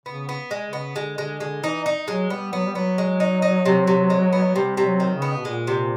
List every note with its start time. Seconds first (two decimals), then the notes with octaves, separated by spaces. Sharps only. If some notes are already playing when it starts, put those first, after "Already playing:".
0.06 C#3 B3
0.29 B3
0.51 G#3
0.66 C#3
0.73 B3
0.96 D3 G#3
1.18 D3 G#3
1.40 D3 G#3
1.63 E3 D#4
1.86 D#4
2.08 F#3 G#3
2.30 G3 B3
2.53 F#3 B3
2.66 G3
2.75 F#3 B3
2.98 G#3
3.20 D#4
3.42 D#4
3.66 C3
3.87 C3
4.10 G#3
4.33 B3
4.55 C3 G3
4.77 C3
4.85 F#3
5.00 D#3
5.15 C#3
5.22 B3
5.37 B2
5.45 A#2 G#3
5.67 C3